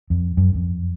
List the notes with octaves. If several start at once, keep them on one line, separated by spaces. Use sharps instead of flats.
F2
F#2
F2